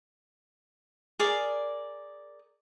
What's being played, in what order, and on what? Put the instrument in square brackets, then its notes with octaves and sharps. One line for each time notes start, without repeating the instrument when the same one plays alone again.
[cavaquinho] G#4 A#4 D5